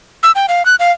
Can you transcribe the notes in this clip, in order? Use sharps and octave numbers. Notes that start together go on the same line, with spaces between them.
E6
G5
F5
F#6
F5